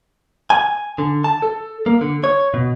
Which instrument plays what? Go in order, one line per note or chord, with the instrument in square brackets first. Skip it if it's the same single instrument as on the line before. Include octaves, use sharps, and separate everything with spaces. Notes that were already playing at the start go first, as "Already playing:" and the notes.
[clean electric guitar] G#5
D3
A5
A4
A#3
D3
C#5
B2